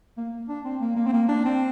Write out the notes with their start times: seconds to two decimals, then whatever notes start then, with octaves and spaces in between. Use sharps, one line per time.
0.17 A#3
0.49 D4
0.65 C4
0.81 A#3
0.96 A#3
1.06 C4
1.13 A#3
1.29 D4
1.45 C4